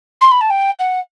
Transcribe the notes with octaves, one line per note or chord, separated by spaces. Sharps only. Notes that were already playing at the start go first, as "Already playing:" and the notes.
C6
B5
A5
G5
F#5